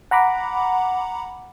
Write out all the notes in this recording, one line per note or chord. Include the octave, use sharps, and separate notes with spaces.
F#5 A#5 B5 D6